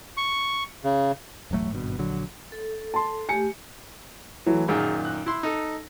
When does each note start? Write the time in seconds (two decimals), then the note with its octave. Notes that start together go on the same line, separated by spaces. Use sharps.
0.17 C#6
0.84 C#3
1.51 E1 A1 F#3 A3
1.71 G#1 G2 B2
1.98 A#1 D3 F#3
2.52 A4
2.94 A5 C6
3.29 A3 G4 G#5 C#7
4.46 E3 F#3 A3
4.68 F#2 A#2 D#3 G#4
5.05 F#6
5.26 E4 C6
5.43 D#4 A4